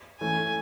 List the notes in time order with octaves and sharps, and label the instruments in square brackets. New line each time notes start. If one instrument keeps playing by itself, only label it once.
[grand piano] E3 A3 C#4 [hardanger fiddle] G#5